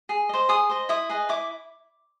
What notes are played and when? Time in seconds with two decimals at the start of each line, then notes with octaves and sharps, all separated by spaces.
0.09 G#4
0.29 C5 D#5
0.49 G#4 D#6
0.69 C5 D#5
0.89 E4 D#6
1.09 G#4 B4 D#5
1.29 E4 D6